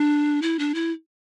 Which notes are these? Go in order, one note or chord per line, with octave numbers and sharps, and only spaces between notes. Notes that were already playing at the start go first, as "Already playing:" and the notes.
Already playing: D4
E4
D4
E4